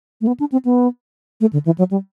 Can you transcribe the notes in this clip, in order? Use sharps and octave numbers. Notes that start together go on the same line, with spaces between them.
A3
B3
D4
C4
B3
A3
D3
E3
F#3
G3